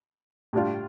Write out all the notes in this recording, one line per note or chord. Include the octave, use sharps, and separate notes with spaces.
A2 G3 D4 F4